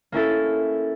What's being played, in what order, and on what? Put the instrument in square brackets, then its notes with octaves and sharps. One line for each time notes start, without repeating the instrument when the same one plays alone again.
[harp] A#3 C#4 E4 A4